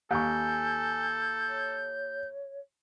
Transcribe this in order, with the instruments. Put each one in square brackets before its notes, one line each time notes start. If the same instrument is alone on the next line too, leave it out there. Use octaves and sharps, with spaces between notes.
[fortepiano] D#2 C#6 [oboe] A4 [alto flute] G#5 [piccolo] G6
[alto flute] C#5